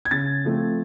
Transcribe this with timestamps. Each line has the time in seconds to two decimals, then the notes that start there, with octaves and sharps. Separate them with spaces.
0.05 G#6
0.11 C#3 A6
0.45 F3 A3 C4